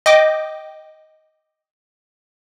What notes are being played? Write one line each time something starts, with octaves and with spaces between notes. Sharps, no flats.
D#5 G5 D6